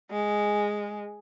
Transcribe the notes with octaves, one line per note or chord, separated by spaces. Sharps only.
G#3